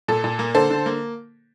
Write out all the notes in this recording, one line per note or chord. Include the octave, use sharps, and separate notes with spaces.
A#2 A4
A#2
A#3
D3 A4 C5
D3
A#3